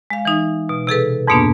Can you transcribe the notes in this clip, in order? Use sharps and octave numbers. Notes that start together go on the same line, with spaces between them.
G#3 F5
E3 D#4
B2
C3 G#4 A4 B4
F2 G#2 B2 A#3 B3 D4